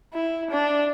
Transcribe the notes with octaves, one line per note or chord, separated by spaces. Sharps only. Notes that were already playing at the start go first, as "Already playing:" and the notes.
E4
D4